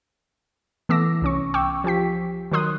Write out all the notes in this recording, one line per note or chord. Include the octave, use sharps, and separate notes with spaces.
E3 A3 B3 D6 E6 A#6
C2 C#4 C#6
G5 C#6 D6 E6
F3 G4 G5 B6
D#3 F#3 A#4 C6 D#6 F#6